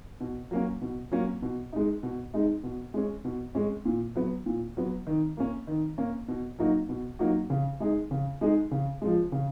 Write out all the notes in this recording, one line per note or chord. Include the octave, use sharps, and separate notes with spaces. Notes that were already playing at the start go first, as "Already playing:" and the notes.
B2
F#3 A#3 C#4
B2
F#3 A#3 C#4
B2
G#3 D#4
B2
G#3 D#4
B2
G#3 C#4
B2
G#3 C#4
A#2
F#3 B3
A#2
F#3 B3
D#3
A#3 C#4
D#3
A#3 C#4
B2
F#3 A#3 D#4 F#4
B2
F#3 A#3 D#4 F#4
C#3
G#3 D#4 G#4
C#3
G#3 D#4 G#4
C#3
F3 G#3
C#3